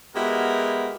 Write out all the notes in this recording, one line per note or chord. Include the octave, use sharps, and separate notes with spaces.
G#3 B3 E4 F#4 G4 A#4